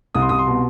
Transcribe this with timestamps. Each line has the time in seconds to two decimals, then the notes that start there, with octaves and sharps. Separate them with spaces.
0.15 C2 D#6
0.22 C6
0.29 C2 D#6
0.39 C6
0.46 B2